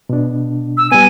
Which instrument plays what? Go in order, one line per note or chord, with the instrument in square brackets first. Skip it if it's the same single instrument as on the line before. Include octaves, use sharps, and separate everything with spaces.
[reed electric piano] B2 D4
[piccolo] E6
[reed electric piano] G3 B3 [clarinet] G#5 [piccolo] D#7